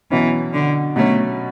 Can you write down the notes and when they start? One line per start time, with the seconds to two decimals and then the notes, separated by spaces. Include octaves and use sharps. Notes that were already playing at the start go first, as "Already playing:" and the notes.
0.11 B2 E3 F#3 C#4
0.53 D3
0.96 B2 F#3 A3 C#4